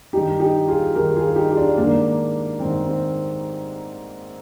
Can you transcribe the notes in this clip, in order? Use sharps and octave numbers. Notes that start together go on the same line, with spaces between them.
G2 D#3 D#4 G4
D#4 G4
F4 G#4
G2 D#3 G4 A#4
F4 G#4
D#4 G4
G4
D4 F4
G#2 D#3 A#3 D4
G#2 D#3 C4
C4